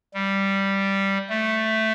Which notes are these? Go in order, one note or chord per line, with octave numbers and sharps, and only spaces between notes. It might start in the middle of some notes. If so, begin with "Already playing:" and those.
G3
A3